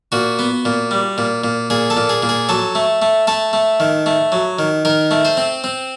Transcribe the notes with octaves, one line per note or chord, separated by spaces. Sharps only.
A#2 F#4
B3
A#2
G3
A#2
A#2
A#2 G#4
A4
A#2
G#4
A#2
G#4
F#3 A4
A3
A3
A3 A4
A3
D#3
A3
F#3
D#3
D#3 A#4
A3
C5
C4
C4